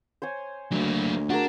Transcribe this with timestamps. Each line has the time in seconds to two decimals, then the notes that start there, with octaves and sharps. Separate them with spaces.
0.22 C5 C#5 G#5
0.72 D2 F#3 A#3
1.30 D4 F#4 G#4 A#4